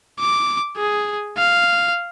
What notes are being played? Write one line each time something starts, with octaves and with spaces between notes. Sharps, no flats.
D6
G#4
F5